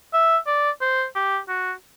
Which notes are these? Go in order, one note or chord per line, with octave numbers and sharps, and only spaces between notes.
E5
D5
C5
G4
F#4